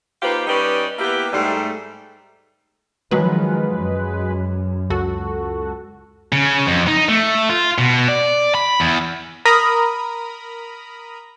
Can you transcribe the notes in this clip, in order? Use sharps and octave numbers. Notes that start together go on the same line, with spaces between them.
A#3 D#4 F4 G4 B4 C5
G3 C#4 D#4 G4 B4 D5
A#3 B3 E4 G4
G#2 G3 A3
D#3 F3 F#3 G#3 B4
F#2
C#2 F#4 A4
C#3
F2
D#4
A3
F4
B2
D5
B5
E2
A#4 A#5 B5 D#6